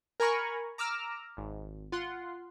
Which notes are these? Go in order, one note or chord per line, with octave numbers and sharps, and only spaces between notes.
A#4 G#5 A#5 B5 C#6
A#5 D6 E6 F6
G#1
F4 F#5 C6